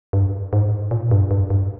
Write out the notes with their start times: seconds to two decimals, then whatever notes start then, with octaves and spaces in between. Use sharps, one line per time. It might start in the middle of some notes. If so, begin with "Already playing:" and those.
0.13 G2
0.53 G#2
0.91 A#2
1.11 G2
1.31 G2
1.50 G2